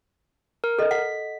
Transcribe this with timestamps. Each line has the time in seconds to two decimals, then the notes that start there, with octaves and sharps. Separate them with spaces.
0.64 A#4
0.79 A4 D#5
0.91 F#5 B6